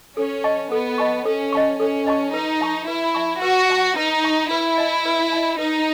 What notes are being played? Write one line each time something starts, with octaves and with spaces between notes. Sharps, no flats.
C#4 A4
D#5 A5 C#6
B3 A4
D#5 A5 C#6
C#4 A4
D#5 A5 C#6
C#4 A4
D#5 A5 C#6
D#4 B4
E5 A5 C#6
E4 B4
E5 A5 C#6
F#4 B4
E5 A5 C#6
D#4 B4
E5 A5 C#6
E4 B4
D#5 A5
B4
D#5 A5
D#4 B4